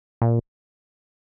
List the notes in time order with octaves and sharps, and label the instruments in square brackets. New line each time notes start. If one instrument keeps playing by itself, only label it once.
[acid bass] A#2